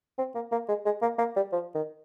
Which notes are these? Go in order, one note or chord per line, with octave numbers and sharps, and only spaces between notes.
C4
A#3
A#3
G#3
G#3
A#3
A#3
G3
F3
D#3